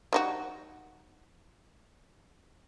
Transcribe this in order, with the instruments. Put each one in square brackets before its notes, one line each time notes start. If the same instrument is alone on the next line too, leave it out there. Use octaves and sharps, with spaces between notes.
[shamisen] G3 D#4 F#4